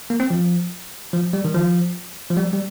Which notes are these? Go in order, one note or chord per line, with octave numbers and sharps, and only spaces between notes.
A#3
C4
F3
F3
G3
D#3
F3
F3
G3
G3